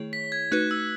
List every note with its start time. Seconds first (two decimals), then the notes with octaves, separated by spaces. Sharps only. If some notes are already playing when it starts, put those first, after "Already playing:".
Already playing: D#3 A3 E4 G#4 C#5
0.13 B6
0.32 G#6
0.52 A3 D#4 F#4 B4 F#6
0.71 E6